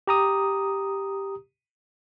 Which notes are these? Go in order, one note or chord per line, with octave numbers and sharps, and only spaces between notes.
G4 A#5 D#6